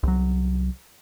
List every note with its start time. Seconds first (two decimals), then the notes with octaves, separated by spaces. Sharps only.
0.03 C2 F#3